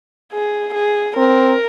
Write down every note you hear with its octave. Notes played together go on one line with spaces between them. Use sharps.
G#4
G#4
C4 A#4